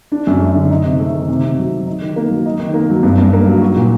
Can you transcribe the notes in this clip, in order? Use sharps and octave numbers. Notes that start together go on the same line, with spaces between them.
D4
F#2
A3
D3
D#4
C3
A3
D#3
C3
C3
F#3
D#3
D#4
D#3
A#3
F#3
D#4
D#3
A#3
F#3
G2
G2
A#3
F#3
F#4
A#2